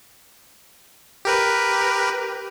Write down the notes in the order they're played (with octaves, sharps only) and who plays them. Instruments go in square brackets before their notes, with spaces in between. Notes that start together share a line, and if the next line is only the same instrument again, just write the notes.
[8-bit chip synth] G4 A#4 B4